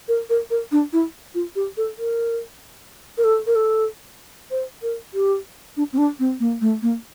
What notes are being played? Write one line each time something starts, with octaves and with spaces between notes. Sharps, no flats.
A#4
A#4
A#4
D4
E4
F4
G4
A4
A#4
A#4
A4
A#4
A4
C5
A#4
G4
D4
C4
D4
C4
A#3
A3
A#3